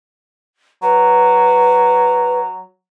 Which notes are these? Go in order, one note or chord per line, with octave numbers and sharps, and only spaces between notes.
F#3 B4